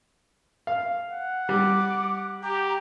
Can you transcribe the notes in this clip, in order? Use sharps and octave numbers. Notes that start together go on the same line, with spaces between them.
F5
F#5
G3 D6
G4 A#5